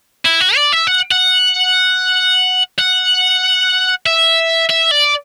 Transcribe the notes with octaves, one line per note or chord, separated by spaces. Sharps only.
E4
F#4
D5
E5
F#5
F#5
F#5
E5
E5
D5